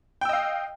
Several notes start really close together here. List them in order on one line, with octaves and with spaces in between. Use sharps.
G5 E6 D#5 F5